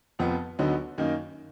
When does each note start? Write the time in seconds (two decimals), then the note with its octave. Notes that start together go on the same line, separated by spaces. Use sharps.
0.19 F1 F2 F3 B3
0.59 D2 D3 F#3 B3 D#4
0.98 F#2 D#3 A#3 D#4